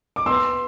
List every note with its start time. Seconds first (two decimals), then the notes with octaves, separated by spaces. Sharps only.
0.16 D6
0.26 B3 C6 E6